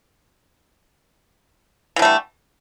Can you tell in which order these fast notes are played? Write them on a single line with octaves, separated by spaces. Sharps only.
E3 D3 A3 G3